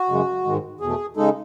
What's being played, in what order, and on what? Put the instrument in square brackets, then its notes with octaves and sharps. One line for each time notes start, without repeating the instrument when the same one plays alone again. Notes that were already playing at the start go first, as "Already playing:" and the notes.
Already playing: [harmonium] F#4
F#2 C#3 G#3
G#2 D#3 G#3
E2 B2 A3 G#4
C#3 G#3 D#4 A4